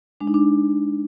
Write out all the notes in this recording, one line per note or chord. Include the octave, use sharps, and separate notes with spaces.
G#3 D4
D#4
D4